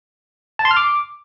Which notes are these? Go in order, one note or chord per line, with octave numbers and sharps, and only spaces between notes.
A5
C6
F6
D6